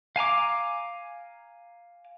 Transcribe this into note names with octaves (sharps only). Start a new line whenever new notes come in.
F5 G#5 A#5 D6